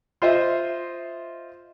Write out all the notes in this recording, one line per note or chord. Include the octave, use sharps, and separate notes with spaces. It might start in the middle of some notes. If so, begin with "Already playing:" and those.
F4 C5 D#5 E5